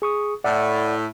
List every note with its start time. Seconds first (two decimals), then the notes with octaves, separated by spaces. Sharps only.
0.02 G#4 C#6 D#6
0.44 A2 D5 E5 F#5